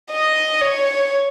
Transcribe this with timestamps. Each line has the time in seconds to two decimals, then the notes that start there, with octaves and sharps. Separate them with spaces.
0.11 D#5
0.61 C#5